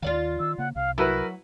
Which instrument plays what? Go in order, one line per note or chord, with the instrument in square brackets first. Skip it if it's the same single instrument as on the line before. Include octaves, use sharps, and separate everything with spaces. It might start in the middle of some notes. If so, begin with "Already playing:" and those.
[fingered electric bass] D#2 D#3 [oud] F4 D5 F5
[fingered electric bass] D#3 [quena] E6
[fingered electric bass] C#3 A#3 [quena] F#5
[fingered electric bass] C2 C3 [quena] F5
[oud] F#3 [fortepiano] E4 F#4 B4 [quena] A#4